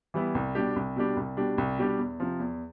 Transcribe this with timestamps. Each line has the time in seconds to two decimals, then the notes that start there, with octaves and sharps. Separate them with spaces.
0.14 E3 G3 B3 E4
0.35 C2
0.55 B2 G3 D4 G4
0.76 C2
0.96 B2 G3 D4 G4
1.17 C2
1.37 B2 G3 D4 G4
1.58 C2
1.78 B2 G3 D4 G4
1.98 E2
2.20 C3 F3
2.39 E2